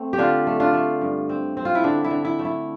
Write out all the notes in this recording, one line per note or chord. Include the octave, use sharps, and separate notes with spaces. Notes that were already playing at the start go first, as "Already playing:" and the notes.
Already playing: A3 C4
G4
D3 D4 F4
A3
D4 F4
A3
G2
C4
C4
F4
E4
D3 D4
E4
D3
E4
A3
E4